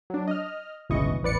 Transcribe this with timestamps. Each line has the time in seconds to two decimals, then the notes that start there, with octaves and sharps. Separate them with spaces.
0.10 F#3 D4
0.27 D#5 F6
0.90 G1 C#2 B2 E3 D#5 C#6
1.22 A1 E2 B4 D5 C#7